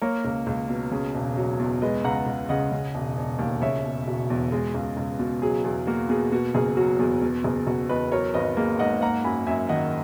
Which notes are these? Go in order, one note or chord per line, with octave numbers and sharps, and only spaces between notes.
A#3 A#4 C#5
C#2
C#2
B2
C#3
E1
F#3
E2
G#3 B4 D#5
C#2 F#5 A#5
C#2
C#3 D#5 F#5
C#3
E1
E1
D#2
C#3 C#5 E5
E1
E1 F#4
E2
G#3
C#2
C#2
B2
F#3 G#4
E2 G#4
A#3 F#4
B2 G#4
B2 F#4
F#1 G#4
F#3 F#4
E2 G#4
B2
F#1 G#4
F#1 F#4
E2 B4 D#5
F#3 A#4 C#5
G#1 B4 D#5
A#3 G#4
G#2 D#5 F#5
A#3 F#5 A#5
F#2 G#5 B5
F#2 E5 G#5
D#3 D#5 F#5